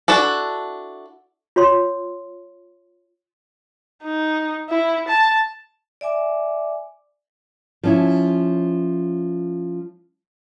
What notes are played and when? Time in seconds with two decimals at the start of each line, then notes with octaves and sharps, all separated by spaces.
0.08 D4 E4 F#4 A4
1.56 F4 C#5 C6
4.04 D#4
4.70 E4
5.08 A5
6.01 D5 E5 G#5 D6
7.83 F3 C#4 E4